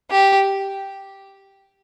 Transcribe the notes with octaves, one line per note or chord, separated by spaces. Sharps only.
G4